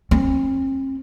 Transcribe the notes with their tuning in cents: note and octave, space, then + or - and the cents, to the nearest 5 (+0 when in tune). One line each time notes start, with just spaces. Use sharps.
C4 +45